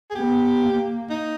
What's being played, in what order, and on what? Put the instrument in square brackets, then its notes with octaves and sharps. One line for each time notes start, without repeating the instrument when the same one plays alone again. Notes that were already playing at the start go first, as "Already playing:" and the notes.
[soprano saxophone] G#4
[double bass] B3 [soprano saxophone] G4
[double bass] A#3
[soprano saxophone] D#4